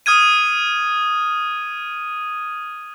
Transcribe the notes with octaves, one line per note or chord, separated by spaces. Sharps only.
D#6 F6 G#6 D#7